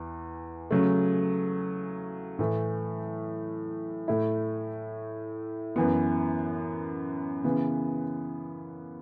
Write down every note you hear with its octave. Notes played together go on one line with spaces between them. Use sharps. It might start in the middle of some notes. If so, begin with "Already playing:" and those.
Already playing: E2 E3
C#3 F#3 A3
A2 E3 A3
A2 A3 E4
F#2 E3 B3
C#3 E3 B3